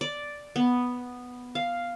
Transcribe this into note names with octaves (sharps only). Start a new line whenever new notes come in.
D5
B3
F5